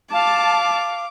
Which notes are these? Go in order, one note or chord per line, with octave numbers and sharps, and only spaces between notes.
F5 A5 D6